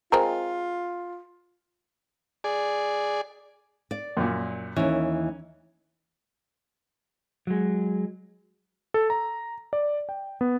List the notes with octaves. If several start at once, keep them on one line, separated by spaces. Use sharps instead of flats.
G#3 C4 F4 A#4
G#4 D5
D5
F#2 A#2
D#2 E3 C#4
F#3 G#3
A4
A#5
D5
G5
B3